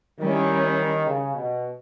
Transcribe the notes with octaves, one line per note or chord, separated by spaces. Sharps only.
D#3 G3 C#4 E4
C#3
B2